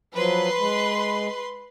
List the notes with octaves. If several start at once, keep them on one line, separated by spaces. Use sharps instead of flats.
F3 F#3 B4 C6
G#3